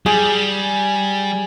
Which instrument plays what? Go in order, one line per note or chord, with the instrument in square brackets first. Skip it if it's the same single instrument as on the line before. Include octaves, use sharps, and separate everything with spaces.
[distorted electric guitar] G3 [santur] G#4